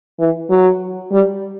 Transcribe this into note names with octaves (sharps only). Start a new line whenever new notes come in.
E3
F#3
G3